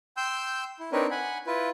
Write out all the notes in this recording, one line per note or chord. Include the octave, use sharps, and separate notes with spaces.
G5 C6 E6 G6
E4
C4 D4 D#4 A#4 B4 C#5
F#5 G#5 B5
E4 F4 B4